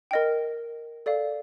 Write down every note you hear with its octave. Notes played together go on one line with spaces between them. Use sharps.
A#4 D#5 G5
A4 D5 F5